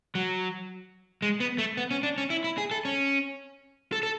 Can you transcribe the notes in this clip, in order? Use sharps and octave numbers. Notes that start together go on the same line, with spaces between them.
F#3
G#3
B3
A3
B3
C#4
D4
C#4
E4
E4
G#4
A4
C#4
A4
A4